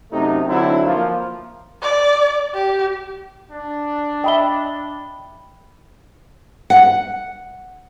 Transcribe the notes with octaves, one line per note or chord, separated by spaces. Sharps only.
F#2 C3 A3 D#4
D3 F#3 C4 D#4 E4
F3 A#3 F4
D5
G4
D4
D#5 E5 G5 B5 G7
F#5